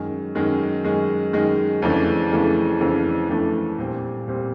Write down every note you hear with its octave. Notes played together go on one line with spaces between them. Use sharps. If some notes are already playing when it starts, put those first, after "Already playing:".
Already playing: F#2 D#3 G#3
F#2 D#3 G#3
F#2 D#3 G#3
F#2 D#3 G#3
F2 C#3 E3 A3 D4
F2 C#3 E3 A3 D4
F2 C#3 E3 A3 D4
F2 C#3 E3 A3 D4
A#2 G3 C4
A#2 G3 C4